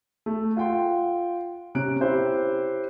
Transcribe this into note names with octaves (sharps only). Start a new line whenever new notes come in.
A3
F4 F#5 G5 C6
C3 C#4 A#5 F#6 D7
E4 G4 C5 C#5